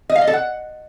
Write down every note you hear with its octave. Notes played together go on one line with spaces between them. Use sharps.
D#5
F5
D#5
A4
F#5